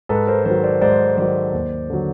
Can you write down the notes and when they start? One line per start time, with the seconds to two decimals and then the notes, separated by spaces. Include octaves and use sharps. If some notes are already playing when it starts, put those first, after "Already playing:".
0.09 G#2 A4 B4
0.27 A#4 C5
0.45 D#3 F#3 A#4 C5
0.64 C5 D5
0.81 G#2 C5 D5
1.17 D#3 F#3 C5 D5
1.53 D#2
1.90 D3 F#3